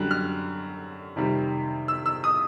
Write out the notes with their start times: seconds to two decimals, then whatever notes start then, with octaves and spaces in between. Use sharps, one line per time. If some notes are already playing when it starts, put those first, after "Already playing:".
Already playing: F#2 D3 G3 F#6
0.11 F6
1.16 F2 C3 D#3 G3
1.88 E6
2.06 E6
2.24 D#6